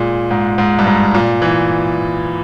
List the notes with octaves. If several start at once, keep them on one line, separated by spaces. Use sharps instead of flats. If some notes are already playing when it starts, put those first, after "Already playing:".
Already playing: A#2 G#3
G#2
G#2
G2
G#2
A#2
E3